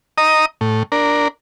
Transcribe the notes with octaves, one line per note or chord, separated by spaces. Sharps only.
D#5 A#5 D#6
A2
D4 A#4